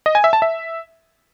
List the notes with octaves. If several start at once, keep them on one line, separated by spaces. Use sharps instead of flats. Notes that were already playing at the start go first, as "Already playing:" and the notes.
D#5
G#5
E5
A5
E5